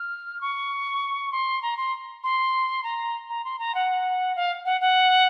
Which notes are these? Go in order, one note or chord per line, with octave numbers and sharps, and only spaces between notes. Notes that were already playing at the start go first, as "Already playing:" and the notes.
Already playing: F6
C#6
C6
A#5
C6
C6
A#5
A#5
C6
A#5
F#5
F5
F#5
F#5